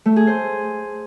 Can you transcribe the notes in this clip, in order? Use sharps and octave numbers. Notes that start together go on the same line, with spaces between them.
A3
G#4
C5